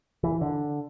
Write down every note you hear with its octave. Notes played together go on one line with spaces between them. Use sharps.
E3
D3